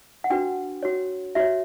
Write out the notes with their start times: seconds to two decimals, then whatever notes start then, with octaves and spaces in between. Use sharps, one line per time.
0.24 F#5
0.30 D4 F#4 B4 G5
0.83 F#4 C#5
1.35 F#4 C#5 E5